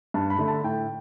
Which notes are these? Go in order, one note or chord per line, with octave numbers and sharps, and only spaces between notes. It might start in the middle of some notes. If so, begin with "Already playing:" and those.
G2 A5
B5
D3 A3 D4
A5
A2 G5